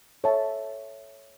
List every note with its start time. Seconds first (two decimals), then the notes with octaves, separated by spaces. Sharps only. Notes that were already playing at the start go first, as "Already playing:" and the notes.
0.24 A4 C#5 E5 A5